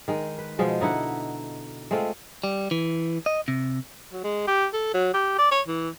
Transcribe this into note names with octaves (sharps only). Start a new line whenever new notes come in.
D#3 G#3
B4
B2 F3 G#3
D3 D#4 E4 F#5
G#3 A3 C4 F4
G3
E3
D#5
C3
F#3
G#3
G4
A4
F#3
G4
D5
C#5
E3